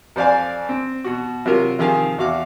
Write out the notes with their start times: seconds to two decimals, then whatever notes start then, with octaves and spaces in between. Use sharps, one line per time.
0.16 F2 C5 D5 F5 G#5
0.69 C4
1.04 B2 F#4
1.46 C3 F#3 F4 A#4
1.79 C3 D#3 F3 G#4 F5
2.18 E2 F#4 F5 D6